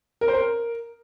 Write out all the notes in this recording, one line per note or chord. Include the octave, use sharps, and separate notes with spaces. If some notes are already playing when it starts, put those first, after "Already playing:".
A#4
C5
A#4